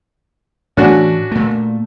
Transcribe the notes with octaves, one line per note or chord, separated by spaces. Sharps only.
A2 E3 A3 C#4 D4 F#4
A#2 A3